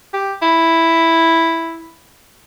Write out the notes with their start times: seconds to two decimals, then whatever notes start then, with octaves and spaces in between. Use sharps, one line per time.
0.13 G4
0.42 E4